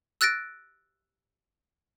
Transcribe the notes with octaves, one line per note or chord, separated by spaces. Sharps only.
E6 F#6 A6 A#6 D7